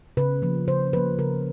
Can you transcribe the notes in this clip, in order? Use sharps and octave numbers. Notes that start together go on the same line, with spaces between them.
C#3 B4
F3 A#3
C#3 C5
F3 A#3 B4
C#3 A#4